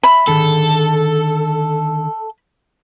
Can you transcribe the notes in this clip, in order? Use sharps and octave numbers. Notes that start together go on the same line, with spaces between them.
E5 B5
D3 D#3 G#4 A4